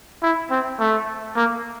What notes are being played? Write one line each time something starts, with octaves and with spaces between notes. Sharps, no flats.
E4
C4
A3
A#3